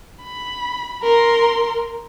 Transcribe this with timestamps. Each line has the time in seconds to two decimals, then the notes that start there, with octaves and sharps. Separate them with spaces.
0.23 B5
1.03 A#4 C6